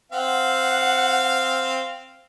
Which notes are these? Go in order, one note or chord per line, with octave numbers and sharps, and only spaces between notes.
C4 F5 F#5